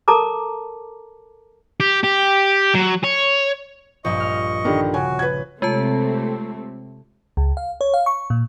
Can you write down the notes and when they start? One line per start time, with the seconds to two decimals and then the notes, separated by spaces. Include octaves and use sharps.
0.08 A4 A#4 A5 A#5 D6
1.80 G4
2.03 G4
2.75 F#3
3.04 C#5
4.05 A#1 G2 D#5 C#6
4.20 F6
4.65 D3 D#3 G3
4.94 C#3 F#4 G#5
5.19 B4 G#6
5.62 C3 G#3 A3 C4 F4 A5
7.37 C#2
7.57 F5
7.81 C#5
7.94 F5
8.06 C#6
8.30 A#2